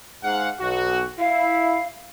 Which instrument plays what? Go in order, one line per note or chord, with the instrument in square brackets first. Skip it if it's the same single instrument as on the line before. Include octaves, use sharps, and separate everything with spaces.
[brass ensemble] G#2 F5 F#5
B1 F#4
[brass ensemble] E4 [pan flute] F5